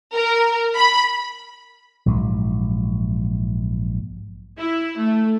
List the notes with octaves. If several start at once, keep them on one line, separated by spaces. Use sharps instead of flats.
A#4
B5
A#1 G#2 F#3
E4
A3